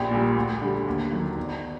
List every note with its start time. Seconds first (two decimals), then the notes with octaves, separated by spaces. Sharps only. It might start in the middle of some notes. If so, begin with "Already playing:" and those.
Already playing: A#1 G4
0.11 A#2 G3
0.36 D2
0.61 D3 G3
0.87 D#2
1.12 D#3 F#3
1.37 G1